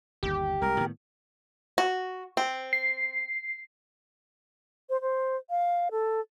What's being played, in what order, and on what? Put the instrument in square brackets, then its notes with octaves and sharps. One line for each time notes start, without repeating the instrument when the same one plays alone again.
[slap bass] G1 D#2 [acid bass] G4
[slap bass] C2 G#3 [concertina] A#4
[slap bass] A2 D#3 B3
[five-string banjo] F#4
C4
[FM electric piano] C7
[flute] C5
C5
F5
A4